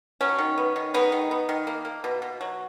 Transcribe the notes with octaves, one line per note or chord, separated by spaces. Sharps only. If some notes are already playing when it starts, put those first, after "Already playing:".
F#3 C#4
D#3
B3
D#3
G#3 B3 D#4
D#3
B3
D#3
A#3
A#3
B2
B2
F#3